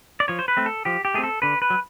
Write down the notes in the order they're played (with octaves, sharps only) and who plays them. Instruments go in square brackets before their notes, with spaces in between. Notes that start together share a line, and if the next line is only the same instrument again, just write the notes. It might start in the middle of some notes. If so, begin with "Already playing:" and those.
[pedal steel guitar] D5
F3 C#5
C5
B4
A3 C4
A4
F3 G4
G4
A3 C4 G#4
A4
D3 B4
B4
F#3